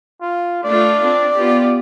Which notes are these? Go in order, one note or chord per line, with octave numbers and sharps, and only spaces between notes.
F4
A3 D4 F4 D5
C4 D4
B3 F4 G4